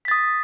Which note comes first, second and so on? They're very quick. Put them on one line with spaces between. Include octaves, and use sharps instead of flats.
B6 A6 D#6